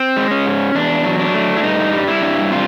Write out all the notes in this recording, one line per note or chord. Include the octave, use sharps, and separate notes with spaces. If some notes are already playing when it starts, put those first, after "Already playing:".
Already playing: C4
G#3
C#4
G#2
E2 D4
F#3
D4
A3
E4
G2 D#4
G3
E4
G2
C3 F4